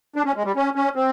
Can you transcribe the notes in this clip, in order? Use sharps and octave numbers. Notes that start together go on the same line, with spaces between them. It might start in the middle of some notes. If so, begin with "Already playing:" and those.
D4
C#4
G#3
G3
C#4
C#4
C4